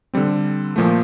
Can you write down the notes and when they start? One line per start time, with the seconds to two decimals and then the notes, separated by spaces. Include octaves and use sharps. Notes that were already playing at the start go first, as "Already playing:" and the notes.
0.14 D3 G3 C4
0.76 A#2 F3 A3